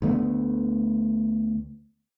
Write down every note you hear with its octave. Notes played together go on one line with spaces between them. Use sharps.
D2 D3 A3 B3